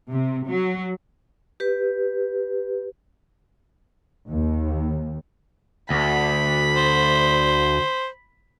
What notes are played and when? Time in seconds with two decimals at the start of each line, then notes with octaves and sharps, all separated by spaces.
0.11 C3
0.50 F#3
1.60 G4 B4
4.28 D#2
5.90 D2 B5
6.76 C5